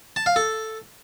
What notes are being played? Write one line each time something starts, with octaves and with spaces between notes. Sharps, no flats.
A5
F5
A4